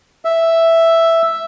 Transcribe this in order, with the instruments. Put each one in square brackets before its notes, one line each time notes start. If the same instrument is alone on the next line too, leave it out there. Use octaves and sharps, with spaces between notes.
[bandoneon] E5